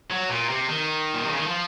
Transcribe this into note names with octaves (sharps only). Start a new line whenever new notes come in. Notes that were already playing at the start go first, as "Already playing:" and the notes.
F#3
A#2
C3
D#3
A#2
C3
C#3
D#3
F3